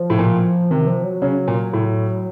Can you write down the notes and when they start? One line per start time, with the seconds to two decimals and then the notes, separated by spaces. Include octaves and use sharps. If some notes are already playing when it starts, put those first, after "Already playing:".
Already playing: F3
0.10 A2
0.19 A#2
0.71 C3 D#3
0.87 F3
1.04 F#3
1.22 C#3 F#3
1.48 A#2
1.73 A2